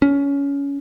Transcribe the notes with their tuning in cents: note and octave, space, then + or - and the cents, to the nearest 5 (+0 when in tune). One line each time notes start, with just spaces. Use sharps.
C#4 +20